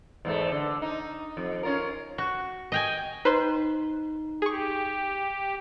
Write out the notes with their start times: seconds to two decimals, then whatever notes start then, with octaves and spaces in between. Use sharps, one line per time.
0.25 E2 G#2 A3
0.51 D3
0.82 D#4
1.37 F2
1.63 C#4 F4 A#4
2.18 F#4
2.72 D#5 G5 G#5
3.25 D#4 B4 C5 C6
4.42 G4 G#4 C#6